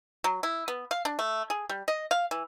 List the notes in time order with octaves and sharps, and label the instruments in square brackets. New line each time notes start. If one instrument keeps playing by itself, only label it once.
[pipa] F#3
E4
B3
F5
D4
A3
G#4
G3
D#5
F5
E3